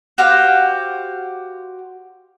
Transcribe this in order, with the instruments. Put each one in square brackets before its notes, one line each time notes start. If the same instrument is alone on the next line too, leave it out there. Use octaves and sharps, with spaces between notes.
[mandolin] F#4 G4 C5 F5